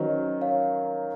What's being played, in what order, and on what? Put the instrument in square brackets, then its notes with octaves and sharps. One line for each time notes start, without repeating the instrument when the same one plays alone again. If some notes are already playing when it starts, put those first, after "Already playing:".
Already playing: [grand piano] D#3 F#3 C#4 [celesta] C5 D#5
[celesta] C#5 F5